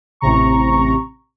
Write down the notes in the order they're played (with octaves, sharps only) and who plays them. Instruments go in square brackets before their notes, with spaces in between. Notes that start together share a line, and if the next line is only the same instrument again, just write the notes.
[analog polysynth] A1 C3 A#5 C#6